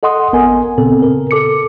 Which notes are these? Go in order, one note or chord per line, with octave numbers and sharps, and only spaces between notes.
A4 D#5 F#5 C6 D#6
G#1 B3 A#4 G#5
A#2 C#3 B3 C4 A4
A#4
A4 D6 C#7